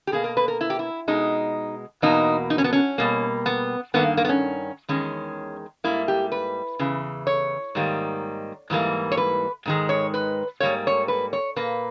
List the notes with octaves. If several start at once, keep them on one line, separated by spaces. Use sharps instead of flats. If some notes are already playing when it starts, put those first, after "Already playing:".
G4
B2 A#3 G#4
A#4
B4
A#4
E4
G4
E4
B2 G#3 D#4
E2 B2 A#3 D#4
D#4
C#4
B3
C#4
B2 G3 A#3
B3
G2 D#3 A#3 B3
A#3
B3
C#4
E2 D#3 G#3 C#4
G#2 G3 A#3 E4
G4
B4
E2 C#3 E3
C#5
G#2 D#3 G3 A#3
G#2 E3 G3 A#3
C#5
B4
G#2 D#3 G#3
C#5
B4
G#2 E3 G3 A#3 C#5
C#5
B4
C#5
A#2 A#3 B4